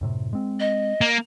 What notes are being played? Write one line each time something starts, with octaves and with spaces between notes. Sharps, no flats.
F#2 A2 C3
G#3 C4
D#5
A#3